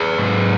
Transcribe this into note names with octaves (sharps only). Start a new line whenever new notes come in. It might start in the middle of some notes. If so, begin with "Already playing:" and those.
Already playing: G#4 B4
G#2